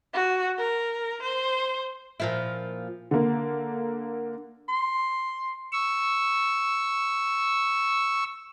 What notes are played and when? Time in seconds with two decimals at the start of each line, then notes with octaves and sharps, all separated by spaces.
0.14 F#4
0.58 A#4
1.22 C5
2.20 A#2 F3 E4
3.11 D3 A#3
4.68 C6
5.73 C#6 E6